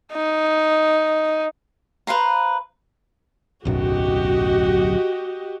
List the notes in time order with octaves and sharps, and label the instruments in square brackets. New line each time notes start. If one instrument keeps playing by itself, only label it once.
[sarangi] D#4
[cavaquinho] B4 C5 F5 A#5
[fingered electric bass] D1 B1 F#2 [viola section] F#4 G4 D#5